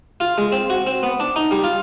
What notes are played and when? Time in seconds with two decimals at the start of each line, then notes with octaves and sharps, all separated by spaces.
0.20 F4
0.38 G#3
0.52 C4
0.70 F#4
0.87 C4
1.03 B3
1.20 D4
1.36 D#4
1.51 G3
1.64 F4